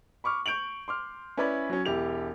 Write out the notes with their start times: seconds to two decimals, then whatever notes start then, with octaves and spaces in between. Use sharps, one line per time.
0.24 B5 C#6 D6 F6
0.46 C#6 G6 D7 F7 F#7
0.88 C6 D6 F6
1.37 C#4 E4 B4 D5 G#5 B5
1.70 F#3 C#4
1.85 E1 E4 G4 F7